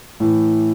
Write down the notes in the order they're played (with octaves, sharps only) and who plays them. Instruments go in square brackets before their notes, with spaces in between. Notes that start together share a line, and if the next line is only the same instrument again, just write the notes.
[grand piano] A2 E3